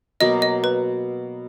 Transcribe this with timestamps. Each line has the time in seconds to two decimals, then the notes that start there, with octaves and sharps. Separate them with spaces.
0.21 B2 F#3 A#3 D#5
0.42 D#5
0.64 B4